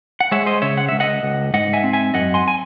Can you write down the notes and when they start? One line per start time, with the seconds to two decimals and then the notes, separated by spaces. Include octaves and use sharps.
0.20 F#5
0.31 G#3 C#5 E5
0.46 C5 D#5
0.62 C#3 C#5 E5
0.77 F#5
0.88 C#2 E5
1.00 D#5 F#5
1.23 C#2
1.54 G#2 D#5 F#5
1.73 E5 G#5
1.84 C4
1.93 E5 G#5
2.14 F#2 D#5 F#5
2.34 G#5 C6
2.48 G#5